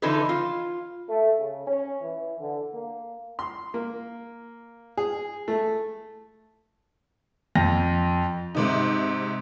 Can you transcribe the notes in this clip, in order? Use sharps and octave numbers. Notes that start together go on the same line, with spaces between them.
D3 E3 F3 D#4 A4 B4
F4
A3
C#3
C#4
E3
D3
A#3
C6
A#3
G#4
A3
F2 A#6
G#2 C3 D#4